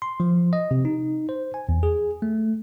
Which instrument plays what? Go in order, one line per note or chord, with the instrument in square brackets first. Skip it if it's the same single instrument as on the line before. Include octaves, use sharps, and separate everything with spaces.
[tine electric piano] C6
F3
D#5
C3
D#4
C5
G#5
E2
G#4
A3